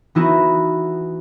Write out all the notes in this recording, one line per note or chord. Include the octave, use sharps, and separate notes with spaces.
E3 B3 D#4 E4 F#4